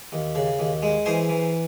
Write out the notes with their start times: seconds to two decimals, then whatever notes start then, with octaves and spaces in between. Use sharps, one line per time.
0.12 D#2
0.35 C#3
0.59 D#2
0.82 G#3
1.06 E3 G#4 C5
1.29 E3